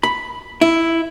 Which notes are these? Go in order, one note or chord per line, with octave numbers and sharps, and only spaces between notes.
B5
E4